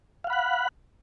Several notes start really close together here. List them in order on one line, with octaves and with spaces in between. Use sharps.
F5 F#5 B5 F#6